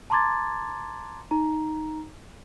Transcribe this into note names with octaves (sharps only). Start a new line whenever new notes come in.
A5 A#5 C6 D6 G#6 A6
D#4 A#5